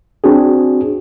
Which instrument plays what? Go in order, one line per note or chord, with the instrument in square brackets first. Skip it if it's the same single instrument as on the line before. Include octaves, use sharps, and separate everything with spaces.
[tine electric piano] C4 D4 F#4 G#4